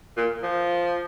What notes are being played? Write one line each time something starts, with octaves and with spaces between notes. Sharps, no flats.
A#2
F3